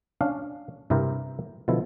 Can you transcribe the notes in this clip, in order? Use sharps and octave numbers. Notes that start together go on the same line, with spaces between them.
C#4 D4 F5
G2 C3 E4 G4 A#4 C5
B2 D3 F3 E4